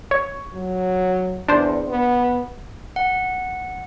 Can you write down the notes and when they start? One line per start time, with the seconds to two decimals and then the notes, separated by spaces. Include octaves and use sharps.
0.11 C#5
0.54 F#3
1.48 E2 D4 C5
1.88 B3
2.96 F#5